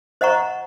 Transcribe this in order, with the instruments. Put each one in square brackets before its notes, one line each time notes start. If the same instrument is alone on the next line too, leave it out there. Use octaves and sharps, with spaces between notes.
[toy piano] C5 D#5 F#5 A#5 C#6